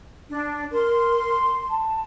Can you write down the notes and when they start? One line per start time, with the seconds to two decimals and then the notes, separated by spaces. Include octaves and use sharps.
0.30 D4
0.72 A#4 C6
1.70 A5